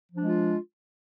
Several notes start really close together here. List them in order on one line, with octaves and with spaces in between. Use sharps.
F3 D4 G#3 F4